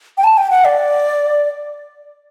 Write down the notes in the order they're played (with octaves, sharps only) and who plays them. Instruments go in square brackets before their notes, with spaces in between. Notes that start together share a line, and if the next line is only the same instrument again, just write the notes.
[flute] G5
A5
G5
F#5
D5